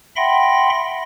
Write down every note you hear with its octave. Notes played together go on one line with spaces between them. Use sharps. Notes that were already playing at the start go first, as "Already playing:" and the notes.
E5 F#5 G5 B5 C6 A#6